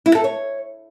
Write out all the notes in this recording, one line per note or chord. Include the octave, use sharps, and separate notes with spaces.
E4
A4
C#5